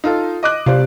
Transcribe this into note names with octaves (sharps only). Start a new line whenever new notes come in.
D#4 F4 A4
D#5 D6 F#6
C3 C5 D5 F5